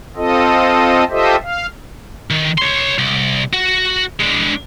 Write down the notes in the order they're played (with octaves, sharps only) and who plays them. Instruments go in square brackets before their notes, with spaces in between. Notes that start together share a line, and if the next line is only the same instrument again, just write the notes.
[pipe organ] C4 F4 A4 D#5
F4 G4 A4 C5 D#5 E5
F5
[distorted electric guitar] D#3
C#5 C6
C2
F#4
G#3 D4